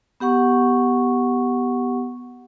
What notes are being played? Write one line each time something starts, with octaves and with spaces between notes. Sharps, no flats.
B3 G4 F#5 C#6